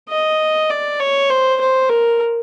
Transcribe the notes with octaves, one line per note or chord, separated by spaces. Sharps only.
D#5
D5
C#5
C5
C5
A#4